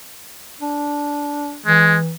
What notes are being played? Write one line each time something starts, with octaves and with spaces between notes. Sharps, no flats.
D4
E3 G#3